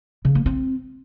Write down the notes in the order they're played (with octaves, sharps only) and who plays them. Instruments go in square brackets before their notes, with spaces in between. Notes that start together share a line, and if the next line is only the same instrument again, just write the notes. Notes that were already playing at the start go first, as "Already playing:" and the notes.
[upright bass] C#3
A#3
C4